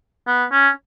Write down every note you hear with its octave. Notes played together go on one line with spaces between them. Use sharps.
B3
C#4